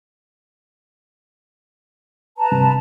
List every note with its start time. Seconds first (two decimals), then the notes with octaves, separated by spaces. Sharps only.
2.37 B4 A5 A#5
2.52 G2 C3